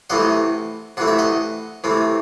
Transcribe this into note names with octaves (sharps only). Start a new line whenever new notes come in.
C3 E3 A3 D#5 F#5
C3 E3 A3 F#5
E5
D#5 F#5
C3 E3 A3